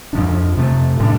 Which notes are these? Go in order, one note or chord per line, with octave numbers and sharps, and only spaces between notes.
F2 F3 D4
F2 C3 A3
A2 G3 D4